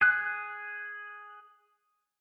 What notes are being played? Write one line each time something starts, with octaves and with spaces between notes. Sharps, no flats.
G#4 F#6